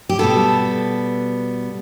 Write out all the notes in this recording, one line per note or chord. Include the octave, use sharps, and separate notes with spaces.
G4
B2 G3 B3 A4